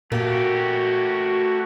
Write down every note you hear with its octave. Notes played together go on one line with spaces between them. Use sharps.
A#2 A3 A#3 F#4 G4